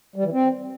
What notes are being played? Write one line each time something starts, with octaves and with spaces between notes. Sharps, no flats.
G3
E3
C4